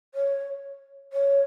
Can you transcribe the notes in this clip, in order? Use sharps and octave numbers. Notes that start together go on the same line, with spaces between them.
C#5
C#5